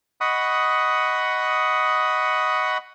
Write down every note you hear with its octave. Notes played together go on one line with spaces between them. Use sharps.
D#5 F#5 B5 C#6 D#6